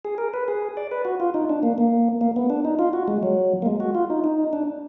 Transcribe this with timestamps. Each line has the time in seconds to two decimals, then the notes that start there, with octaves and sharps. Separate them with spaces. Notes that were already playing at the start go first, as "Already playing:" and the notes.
0.05 G#4
0.18 A#4
0.34 B4
0.48 G#4
0.77 D5
0.92 B4
1.05 F#4
1.20 F4
1.34 D#4
1.49 D4
1.63 A#3
1.78 A#3
2.21 A#3
2.36 B3
2.50 D4
2.65 D#4
2.79 F4
2.93 F#4
3.08 G#3
3.23 F#3
3.62 A#3
3.66 G#3
3.80 F#4
3.95 F4
4.10 D#4
4.24 D#4
4.53 D4